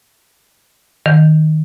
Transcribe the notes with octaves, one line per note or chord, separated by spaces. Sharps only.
D#3